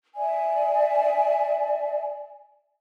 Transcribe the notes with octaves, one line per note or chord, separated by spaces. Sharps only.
D5 E5 G#5